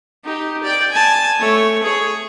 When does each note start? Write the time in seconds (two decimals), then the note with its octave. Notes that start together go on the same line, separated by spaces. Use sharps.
0.25 D#4 G4
0.63 D5 G5
0.92 G#5 A5
1.39 A3 C#5
1.83 G#4 C#5